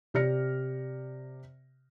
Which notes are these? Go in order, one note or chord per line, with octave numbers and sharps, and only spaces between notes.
C3 G4 D5 F6 A#6 C#7